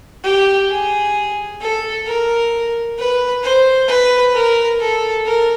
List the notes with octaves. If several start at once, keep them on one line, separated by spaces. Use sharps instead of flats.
G4
G#4
A4
A#4
B4
C5
B4
A#4
A4
A#4